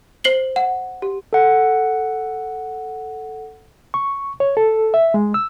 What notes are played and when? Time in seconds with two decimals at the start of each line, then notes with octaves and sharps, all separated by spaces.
0.24 C5 C7 F#7 G7
0.56 F#5
1.02 G4
1.33 A4 F#5
3.94 C#6
4.40 C#5
4.57 A4
4.94 E5
5.14 G#3
5.34 E6